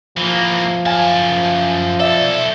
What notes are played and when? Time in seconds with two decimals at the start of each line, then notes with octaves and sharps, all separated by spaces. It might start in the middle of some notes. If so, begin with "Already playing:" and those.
0.17 E3 F3 A#3
0.86 F#2 F5 G#5 A5
2.00 B1 A4 D5 E5